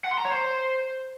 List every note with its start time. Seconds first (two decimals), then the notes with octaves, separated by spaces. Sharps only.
0.05 F#5
0.12 C6
0.18 A#5
0.25 C#5
0.32 C5